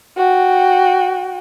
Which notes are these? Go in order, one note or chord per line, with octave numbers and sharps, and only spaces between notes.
F#4 G5